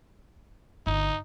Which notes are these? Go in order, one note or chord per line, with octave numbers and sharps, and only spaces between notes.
G1 D#4